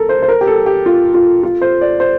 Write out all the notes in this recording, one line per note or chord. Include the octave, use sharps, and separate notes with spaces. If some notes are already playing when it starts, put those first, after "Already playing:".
Already playing: A4 A#4
C5
C5
A#4
G4
A4
G4
F4
F4
F4
C5
D5
C5